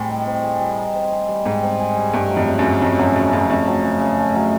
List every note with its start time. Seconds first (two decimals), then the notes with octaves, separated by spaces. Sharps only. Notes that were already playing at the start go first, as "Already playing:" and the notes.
Already playing: A2 G3 C4 G#4
0.09 D#4
0.26 C4
0.43 G#4
0.60 G3
0.77 D#4
0.94 C4
1.12 G#4
1.28 G3
1.45 G#2 D#4
1.62 C4
1.79 G#4
1.97 G3
2.13 G2 A3
2.31 F#3
2.36 F2
2.48 C#3
2.59 F#2
2.64 C#3
2.82 F2 A3
2.98 F#2 F#3
3.16 F#2 C#3
3.33 F#2 C#3
3.49 F2 A3
3.67 F#3
3.84 C#3
4.01 C#3
4.18 A3
4.35 F#3